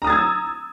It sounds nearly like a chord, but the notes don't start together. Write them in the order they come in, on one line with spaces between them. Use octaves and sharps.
A#5 D#6 A6 G#6 E6